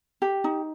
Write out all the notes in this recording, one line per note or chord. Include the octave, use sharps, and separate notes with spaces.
G4
D#4